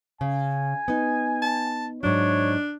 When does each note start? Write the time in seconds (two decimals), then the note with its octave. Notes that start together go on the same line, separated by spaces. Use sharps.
0.21 C#3 G#5
0.88 B3 D#4
1.42 A5
2.03 G#2 F#3 D4 C#5